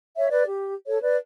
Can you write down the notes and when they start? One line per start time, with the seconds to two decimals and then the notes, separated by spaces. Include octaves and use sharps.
0.17 C#5 E5
0.31 B4 D5
0.45 G4
0.87 A4 C#5
1.01 B4 D5